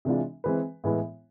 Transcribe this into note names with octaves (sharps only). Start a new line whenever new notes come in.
C3 E3 G#3 D4 F4
E3 G#3 C4 G#4 B4
A2 E3 G#3 B3 E4